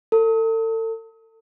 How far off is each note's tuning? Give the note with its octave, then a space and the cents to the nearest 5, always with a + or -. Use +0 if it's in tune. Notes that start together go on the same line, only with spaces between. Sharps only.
A4 +35